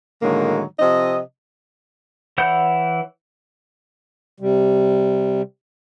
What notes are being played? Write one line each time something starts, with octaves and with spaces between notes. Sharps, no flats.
A2 D3 D#3 F#3 G#3 A#3
C3 F3 C4 D#5
E3 E4 C#5 F#5 G6
C3 G3